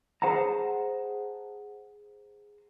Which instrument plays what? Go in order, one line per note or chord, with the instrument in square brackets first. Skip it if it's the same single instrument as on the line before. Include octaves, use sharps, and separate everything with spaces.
[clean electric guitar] G#4 C5 F#5 A5 A#5